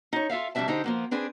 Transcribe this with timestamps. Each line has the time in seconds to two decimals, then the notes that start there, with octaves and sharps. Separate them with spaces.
0.13 D#4 C#5
0.30 F4 A4 E5 F5
0.55 F2 C3 G3 D4 E5 A5
0.68 D3 D#4 G4 C5
0.84 F3 A#3 B3
1.11 C4 D4 G#4 B4